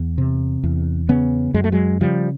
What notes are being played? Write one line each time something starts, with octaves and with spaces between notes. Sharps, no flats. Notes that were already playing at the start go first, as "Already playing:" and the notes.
Already playing: E2 B3
C3
E2
C#3 B3 C#4
F#2 G#3
A3
F#3 G#3
C#3 F3 G3